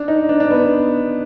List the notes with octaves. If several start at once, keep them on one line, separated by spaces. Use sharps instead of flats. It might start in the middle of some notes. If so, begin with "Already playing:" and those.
Already playing: D4
D#4
D4
D4
B3